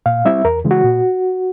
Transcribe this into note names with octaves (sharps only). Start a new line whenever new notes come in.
A#2 F5
G3 C4 E4 E5
E2 A#4
C#3 E3 G#3
F#4
A#2